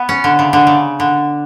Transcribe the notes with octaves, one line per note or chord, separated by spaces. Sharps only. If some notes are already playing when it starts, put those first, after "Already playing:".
Already playing: B3
C#4
D3
C#3
D3
C#3
D3